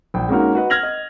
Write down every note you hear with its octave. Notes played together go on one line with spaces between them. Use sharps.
A#1 G5
G#3 A#3 C#4 D#4 F#4 A#4
F#4 B4 D#5
F6 G#6 A#6 F7 F#7
D#5